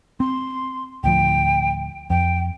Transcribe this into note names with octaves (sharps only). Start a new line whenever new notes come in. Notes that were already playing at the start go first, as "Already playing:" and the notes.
C4 C6
D1 D2 F3 G5
F2 G5